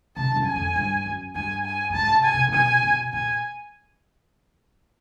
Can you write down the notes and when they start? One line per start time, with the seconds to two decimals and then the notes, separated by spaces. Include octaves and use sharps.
0.17 C3 A5
0.32 G2
0.36 F#2
0.46 G#5
0.56 F2
0.76 G2
1.06 F#2
1.35 G2 G#5
1.65 G#5
1.90 A2
1.94 G#2 A5
2.14 C3
2.24 G#5
2.34 C3
2.49 A#2
2.54 B2 G#5
2.83 B2
3.13 A#2 G#5